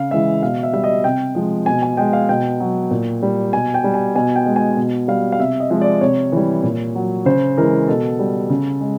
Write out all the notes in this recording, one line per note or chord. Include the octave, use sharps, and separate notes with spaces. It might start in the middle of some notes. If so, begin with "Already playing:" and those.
Already playing: C#3 F5
E3 G#3 E5
B2 F5
E5
G3 E5
D#5
C3 G5
F3 G#3
B2 G#5
G#5
G#3 G5
F5
B2 G5
F#3
A#2
G3
B2 G#5
G5
G3
G#5
B2 G#5
G5
G#3
G#5
B2
G3 F5
F5
C3 E5
D#5
F3 G#3
D5
C3 C#5
E3 G3
A#2
F#3
C#3 C5
E3 G#3 A#4
B2 A4
G3
C#3
G#3